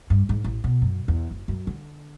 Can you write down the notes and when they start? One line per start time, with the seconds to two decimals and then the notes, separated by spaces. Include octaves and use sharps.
0.10 G2
0.29 G#2
0.44 A1
0.64 B2
0.82 F#2
1.08 E2
1.31 F#1
1.48 F#2
1.67 D3